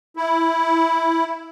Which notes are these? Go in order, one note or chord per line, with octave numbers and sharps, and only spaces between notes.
E4